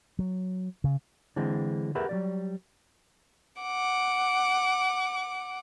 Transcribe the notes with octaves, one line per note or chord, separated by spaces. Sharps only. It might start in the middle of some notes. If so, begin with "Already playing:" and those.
F#3
C#3
D3 E3 G#3 C4
G4 G#4 A#4 B4 E5 F#5
F#3 G3 D5
F#5 D6